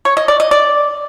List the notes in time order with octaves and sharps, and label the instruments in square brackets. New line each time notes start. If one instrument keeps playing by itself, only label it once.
[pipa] C#5
D#5
D5
D#5
D5